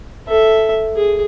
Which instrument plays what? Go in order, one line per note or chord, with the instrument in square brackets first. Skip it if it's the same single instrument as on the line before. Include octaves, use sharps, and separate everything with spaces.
[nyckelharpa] A4 E5
G#4